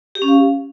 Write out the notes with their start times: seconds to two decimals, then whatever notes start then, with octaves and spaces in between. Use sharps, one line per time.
0.15 G4
0.22 C#4
0.28 F5